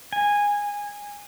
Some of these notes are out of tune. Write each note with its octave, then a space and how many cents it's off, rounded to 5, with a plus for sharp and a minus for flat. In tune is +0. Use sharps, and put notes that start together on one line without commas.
G#5 -15